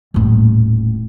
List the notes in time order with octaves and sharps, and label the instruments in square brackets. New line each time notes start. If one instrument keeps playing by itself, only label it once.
[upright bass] D#1 A2